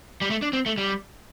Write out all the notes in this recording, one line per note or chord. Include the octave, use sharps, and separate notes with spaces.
G3
A3
D4
C4
A3
G3